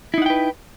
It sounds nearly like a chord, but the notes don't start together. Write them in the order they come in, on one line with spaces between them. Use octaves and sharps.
E4 D#4 F#5 G5 B4